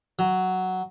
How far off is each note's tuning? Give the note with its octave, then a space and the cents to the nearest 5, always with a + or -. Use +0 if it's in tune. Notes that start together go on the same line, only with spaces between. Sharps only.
F#3 +5